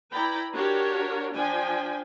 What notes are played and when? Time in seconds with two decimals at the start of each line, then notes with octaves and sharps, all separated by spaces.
0.12 E4 B4 D5 G5 A#5 B5
0.52 D4 F#4 G4 A#4 C#5
1.35 F3 D4 G5 G#5